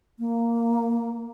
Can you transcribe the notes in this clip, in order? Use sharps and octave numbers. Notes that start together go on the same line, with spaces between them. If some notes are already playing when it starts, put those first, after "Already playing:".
A#3